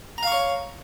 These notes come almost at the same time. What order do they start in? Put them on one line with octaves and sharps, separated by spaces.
A#5 F5 C#6 C#5